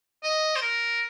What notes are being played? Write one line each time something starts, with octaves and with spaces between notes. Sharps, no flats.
D#5
C5
A#4